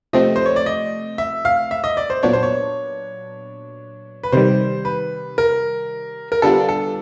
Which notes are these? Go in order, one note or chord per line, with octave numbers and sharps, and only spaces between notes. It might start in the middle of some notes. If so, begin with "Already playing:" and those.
C3 F3 A3 C4 D#5
C5
C#5
D5
D#5
E5
F5
E5
D#5
D5
C5
A#2 F#3 B3 D4 C#5
C5
C#5
B4
C3 D#3 G3 C5
B4
A#4
A#4
D3 G3 B3 D4 F4 A4
A4